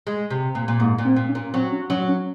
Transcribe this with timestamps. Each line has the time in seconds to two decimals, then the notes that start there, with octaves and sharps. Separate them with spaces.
0.07 G#3
0.30 C3
0.55 A#2
0.68 A#2
0.80 G#2 A#3
0.98 A#2
1.05 C4
1.16 A#2
1.29 C#4
1.35 A#2
1.53 F#3 C4
1.72 C#4
1.89 F#3 C#4
2.08 C#4